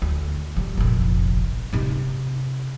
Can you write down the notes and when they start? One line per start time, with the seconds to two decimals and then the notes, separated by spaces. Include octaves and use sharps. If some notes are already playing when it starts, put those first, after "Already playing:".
0.02 D2
0.56 F2 G3
0.77 F1 A#1
1.73 C3 D#4